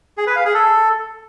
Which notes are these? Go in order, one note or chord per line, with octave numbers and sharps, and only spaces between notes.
G#4
B4
F5
G#4
A4